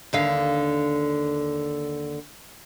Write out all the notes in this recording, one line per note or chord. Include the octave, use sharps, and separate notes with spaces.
D#2 D3 F5